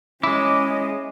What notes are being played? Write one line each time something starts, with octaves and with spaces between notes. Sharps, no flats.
G#3 C#4 E4 D#5 D6